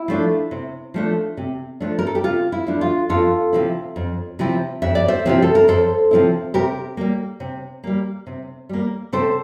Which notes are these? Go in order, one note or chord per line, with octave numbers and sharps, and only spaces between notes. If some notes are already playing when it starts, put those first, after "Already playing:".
Already playing: E4
F3 A3 D4
C3
F3 A3 D4
C3
F3 A3 D4
A#4
A4
G4
C3 F4
E4
F3 A3 D4
F4
F2 F4 A4
C3 F3 C4 E4
F2
C3 F3 C4 E4
F2 E5
D5
C5 E5
C3 F3 C4 E4 G4
A4
A#4
F2 A4 C5
C3 F3 C4 E4
C3 G4 A#4
G3 A#3
C3
G3 A#3
C3
G3 A#3
C3 A4 C5